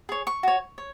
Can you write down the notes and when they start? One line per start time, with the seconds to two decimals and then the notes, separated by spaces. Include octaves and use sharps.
0.09 G#4 C#5
0.27 C#6
0.43 F#4 C#5
0.78 C#5